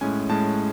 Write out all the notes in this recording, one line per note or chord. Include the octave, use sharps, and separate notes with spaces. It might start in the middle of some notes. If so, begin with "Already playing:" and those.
A2 G#3 C#4 G#5
A2 G#3 C#4 A5